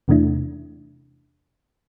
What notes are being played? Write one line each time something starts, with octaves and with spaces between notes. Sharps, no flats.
E2 C3 E3 A3 D4 E4